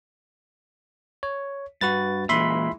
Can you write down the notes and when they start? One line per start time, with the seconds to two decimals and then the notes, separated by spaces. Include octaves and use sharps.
1.23 C#5
1.81 G2 F#4 B4 A6
2.29 A#2 E3 G#3 E5 B5 C6